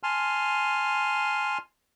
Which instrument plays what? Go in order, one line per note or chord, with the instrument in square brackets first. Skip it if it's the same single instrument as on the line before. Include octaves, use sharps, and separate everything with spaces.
[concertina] G#5 A5 C6 F6